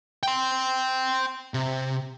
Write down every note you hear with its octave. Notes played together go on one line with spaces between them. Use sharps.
G5 C6
C3